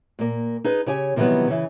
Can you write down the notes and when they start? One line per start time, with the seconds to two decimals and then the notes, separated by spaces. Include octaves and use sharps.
0.19 A#2 A#3
0.64 D#4 G#4 B4
0.86 C#3 G4 C#5 G#5
1.16 C3 D#3 E3 F#3 G3 B3
1.47 C#3 E3